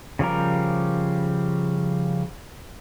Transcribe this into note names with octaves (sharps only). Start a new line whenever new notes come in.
C#3 F3 G3 A#4